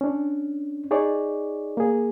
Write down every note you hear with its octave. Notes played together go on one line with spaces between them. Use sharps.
C#4 D4
D#4 G#4 C#5 D5
A#3 G#4